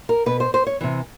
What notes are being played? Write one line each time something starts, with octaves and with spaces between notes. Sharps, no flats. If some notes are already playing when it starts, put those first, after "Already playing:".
A#4
B2 B4
C5
C5
C#5
C3 E3